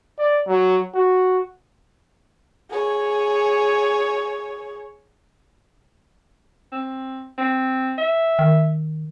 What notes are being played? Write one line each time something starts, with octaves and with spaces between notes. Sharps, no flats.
D5
F#3
F#4
G#4 C#5
C4
C4
E5
D#3